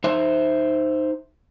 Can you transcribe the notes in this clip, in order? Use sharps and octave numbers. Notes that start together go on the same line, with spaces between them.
D#4 C5 E5